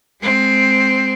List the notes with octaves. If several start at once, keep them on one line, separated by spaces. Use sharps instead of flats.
G#3 C4